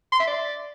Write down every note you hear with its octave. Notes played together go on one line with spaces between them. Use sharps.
C6
E5
D5